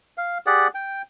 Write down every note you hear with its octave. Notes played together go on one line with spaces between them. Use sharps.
F5
G4 G#4 D5 F#5
G5